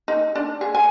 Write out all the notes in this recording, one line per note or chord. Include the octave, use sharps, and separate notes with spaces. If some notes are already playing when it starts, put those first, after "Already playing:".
D#4
D4
G#4
G#5